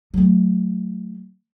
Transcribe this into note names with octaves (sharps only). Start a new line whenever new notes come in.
F#3 A3